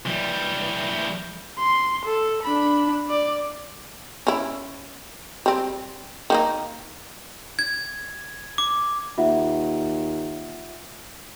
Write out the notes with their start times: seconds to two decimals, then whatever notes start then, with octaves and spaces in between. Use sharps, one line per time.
0.06 E3 G3
1.59 C6
2.05 A4
2.43 D4 B5
3.10 D5
4.27 C#4 E4
5.46 G3 C4
6.30 D#3 A#3 D#4
7.59 G#6
8.58 D6
9.18 D#2 F4 E5 F#5